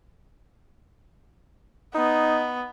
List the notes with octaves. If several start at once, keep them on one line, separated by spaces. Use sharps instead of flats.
B3 D#4